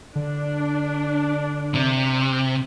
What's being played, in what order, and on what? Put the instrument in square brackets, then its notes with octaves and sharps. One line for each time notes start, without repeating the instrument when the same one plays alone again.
[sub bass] D3 [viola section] D4
[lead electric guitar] C3